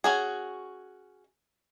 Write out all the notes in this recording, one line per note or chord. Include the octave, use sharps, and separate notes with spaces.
C#4 F#4 G#4